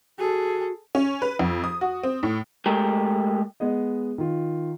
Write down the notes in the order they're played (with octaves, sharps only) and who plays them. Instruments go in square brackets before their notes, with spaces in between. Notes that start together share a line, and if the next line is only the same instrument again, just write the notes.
[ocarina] F#4 [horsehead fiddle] G#4 A4
[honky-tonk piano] C#4
B4
F2
D#6
F#4
C4
A2
[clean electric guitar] G#3 A3 G4 A#4
[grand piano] G#3 B3 D#5
D#3 F4